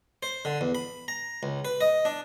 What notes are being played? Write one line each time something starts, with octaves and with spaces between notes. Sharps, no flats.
C5
D3
E2
B5
A#5
C#2
B4
D#5
D4